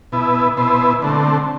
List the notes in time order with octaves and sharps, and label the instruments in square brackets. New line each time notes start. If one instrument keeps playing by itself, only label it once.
[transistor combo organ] B2 B3 E4
B2 B3 E4 C5
D3 A3 C4